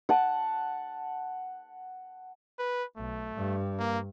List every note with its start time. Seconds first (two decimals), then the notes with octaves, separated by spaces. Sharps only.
0.09 F#5 A5
2.59 B4
2.97 B1 A3
3.34 G2
3.79 A#3